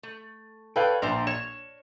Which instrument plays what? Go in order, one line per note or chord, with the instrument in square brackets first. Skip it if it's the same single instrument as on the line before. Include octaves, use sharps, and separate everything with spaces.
[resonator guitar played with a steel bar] A3
[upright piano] A4 B4 F5 [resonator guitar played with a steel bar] C#5 D5 G5
[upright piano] A#1 [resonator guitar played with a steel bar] D4 C5 A#5
[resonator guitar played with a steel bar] C#5 [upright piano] E7